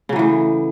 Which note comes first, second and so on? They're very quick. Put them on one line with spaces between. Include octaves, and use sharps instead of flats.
C#3 F#3 E3 A2